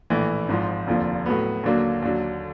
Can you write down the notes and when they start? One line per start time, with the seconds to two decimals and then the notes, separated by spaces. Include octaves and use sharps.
0.10 A#1 A2 E3
0.49 G#1 G#2 F3
0.87 F1 D#2 D3 F3
1.26 A2 F#3 B3
1.64 D#2 D3 F#3 A#3
2.02 D#2 D3 F#3